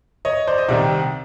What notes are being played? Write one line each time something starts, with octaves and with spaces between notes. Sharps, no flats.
C#5 D#5
C5 D5
D#5
C2 C3 D#3 D5 E5